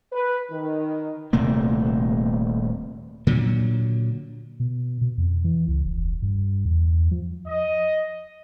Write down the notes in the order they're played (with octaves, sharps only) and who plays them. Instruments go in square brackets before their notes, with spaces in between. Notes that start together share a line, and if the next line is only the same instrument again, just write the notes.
[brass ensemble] B4
D#3
[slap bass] D#1 C3 A3 A#3
A#2 D3 F#3
[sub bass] B2
B2
F2
E3
C#2
E1
G2
E2
F3
[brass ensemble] D#5